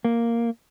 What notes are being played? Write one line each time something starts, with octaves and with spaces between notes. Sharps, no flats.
A#3